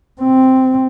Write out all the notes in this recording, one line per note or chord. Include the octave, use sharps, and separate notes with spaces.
C4